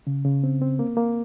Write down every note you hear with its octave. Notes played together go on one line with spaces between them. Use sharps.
C#3
C#3
C4
C4
A#3
A#3